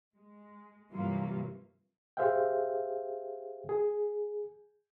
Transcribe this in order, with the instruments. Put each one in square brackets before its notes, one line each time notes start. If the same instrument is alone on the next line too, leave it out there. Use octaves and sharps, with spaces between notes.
[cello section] G#3
G2 C3 E3 F#3 A#3 F4
[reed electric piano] G4 G#4 C5 E5 F5 G5
G#4